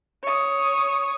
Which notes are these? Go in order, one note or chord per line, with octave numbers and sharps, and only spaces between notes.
C#5 D#6